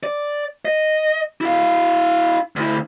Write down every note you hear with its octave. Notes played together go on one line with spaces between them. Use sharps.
D5
D#5
E4 F5
D2 E4